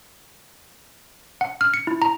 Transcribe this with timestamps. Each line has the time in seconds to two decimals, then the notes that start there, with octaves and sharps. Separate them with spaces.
1.41 F#5
1.61 F6
1.74 C#7
1.87 E4
2.02 A#5